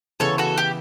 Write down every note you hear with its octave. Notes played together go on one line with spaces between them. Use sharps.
C#3 E3 B3 A4 C#5
F#4 A4
G4